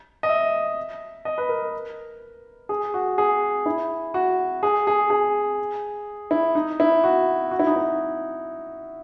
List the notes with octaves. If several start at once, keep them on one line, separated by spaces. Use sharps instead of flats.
D#5
E5
D#5
B4
A#4
G#4
F#4
G#4
E4
F#4
G#4
G#4
G#4
E4
D#4
E4
F#4
F#4
E4
D#4
E4